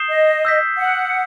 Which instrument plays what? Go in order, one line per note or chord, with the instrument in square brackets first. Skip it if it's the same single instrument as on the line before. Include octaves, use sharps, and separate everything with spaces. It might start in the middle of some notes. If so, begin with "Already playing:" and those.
Already playing: [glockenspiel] D#6 G6 C7 E7 G7
[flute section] D#5
[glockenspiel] E6 G6 B6
[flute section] F#5